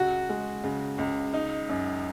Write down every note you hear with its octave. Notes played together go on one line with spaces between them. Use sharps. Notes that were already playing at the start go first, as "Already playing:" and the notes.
Already playing: C#2 F#4
G#3
C#3
C#2
D#4
F#2